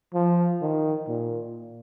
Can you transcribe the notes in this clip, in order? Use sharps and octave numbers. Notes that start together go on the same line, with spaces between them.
F3
D#3
A#2